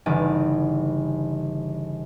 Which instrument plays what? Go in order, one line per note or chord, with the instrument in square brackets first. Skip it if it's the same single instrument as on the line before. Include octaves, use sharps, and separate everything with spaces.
[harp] G1 C#3 E3 D#4 D5